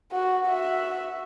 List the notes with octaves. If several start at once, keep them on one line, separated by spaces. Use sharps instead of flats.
F#4
F#4 E5